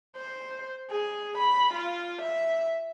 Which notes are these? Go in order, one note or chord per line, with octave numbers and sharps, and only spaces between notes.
C5
G#4
B5
F4
E5